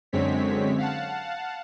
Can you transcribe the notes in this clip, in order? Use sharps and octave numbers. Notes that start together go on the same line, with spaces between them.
F#2 D3 G#3 C4 C#5 B6
F5 F#5 A5